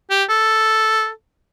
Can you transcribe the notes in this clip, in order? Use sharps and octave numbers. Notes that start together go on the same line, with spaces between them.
G4
A4